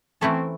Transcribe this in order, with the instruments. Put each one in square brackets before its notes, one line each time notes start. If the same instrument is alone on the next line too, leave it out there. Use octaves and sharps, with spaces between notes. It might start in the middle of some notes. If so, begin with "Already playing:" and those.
[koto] E3 A3 C#4 E4 A4 [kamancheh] C4